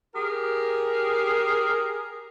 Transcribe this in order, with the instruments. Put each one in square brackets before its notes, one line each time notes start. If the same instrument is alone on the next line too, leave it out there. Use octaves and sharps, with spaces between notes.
[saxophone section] G4 G#4 A#4